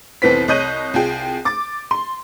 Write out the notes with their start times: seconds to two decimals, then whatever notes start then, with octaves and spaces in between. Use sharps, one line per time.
0.22 F1 C2 E3 B3 C4 B6
0.48 C2 C#5 D#5 F#6 G6 D#7
0.94 C2 F4 G#4 G5
1.45 D6 A6
1.91 C6